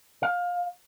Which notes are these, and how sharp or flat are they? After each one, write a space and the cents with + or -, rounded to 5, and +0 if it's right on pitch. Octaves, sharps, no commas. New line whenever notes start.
F5 +20